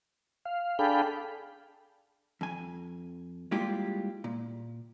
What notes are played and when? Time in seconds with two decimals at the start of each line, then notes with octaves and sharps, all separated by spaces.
0.45 F5
0.79 D4 G#4 A4 F5 G5 B5
2.41 F2 G#5
3.51 G3 G#3 A#3 E4 F4 G4
4.24 A#2